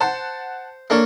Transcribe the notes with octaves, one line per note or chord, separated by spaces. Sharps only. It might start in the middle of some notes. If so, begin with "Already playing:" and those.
C5 F#5 A5
A#3 D4 A4 C#5